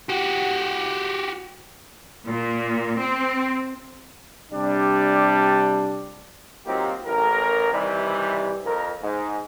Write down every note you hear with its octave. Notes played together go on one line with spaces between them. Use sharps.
F#4 G4
A#2
C4
C3 G3 D4
F#3 A#3 C4 D#4 F4 G4
A1 A#4
C3 D#3 E3 G3
F2 A#4
G#2